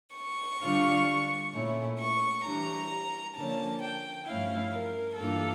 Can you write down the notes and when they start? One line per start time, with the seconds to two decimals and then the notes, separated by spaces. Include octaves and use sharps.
0.16 C#6
0.62 D3 G3 D4 F4
1.53 A#2 A3 C#4 E4
1.99 C#6
2.43 E3 G3 D4 A#5
3.36 D3 F3 A#3 C#4 A5
3.80 G5
4.26 G2 F3 A3 C#4 E4 F5
4.72 A#4
5.17 G2 E3 A#3 D4 F4 A4